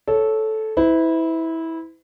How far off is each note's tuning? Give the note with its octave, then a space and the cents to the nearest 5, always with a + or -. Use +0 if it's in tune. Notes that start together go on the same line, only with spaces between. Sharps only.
A4 -10 C#5 +0
E4 -20 B4 +45